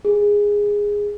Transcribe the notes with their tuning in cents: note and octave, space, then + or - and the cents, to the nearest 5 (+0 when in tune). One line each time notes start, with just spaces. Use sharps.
G#4 -10